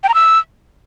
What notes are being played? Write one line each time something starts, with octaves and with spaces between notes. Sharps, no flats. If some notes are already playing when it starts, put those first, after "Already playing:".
G5
A#5
E6